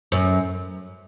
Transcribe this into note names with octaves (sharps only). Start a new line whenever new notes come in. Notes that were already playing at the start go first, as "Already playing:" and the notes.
F#2